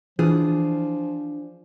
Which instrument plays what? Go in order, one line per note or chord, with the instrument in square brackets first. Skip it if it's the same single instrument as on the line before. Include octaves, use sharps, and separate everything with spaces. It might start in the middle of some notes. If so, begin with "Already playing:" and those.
[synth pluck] E3 [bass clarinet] F3 [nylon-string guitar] D4 F4 G#4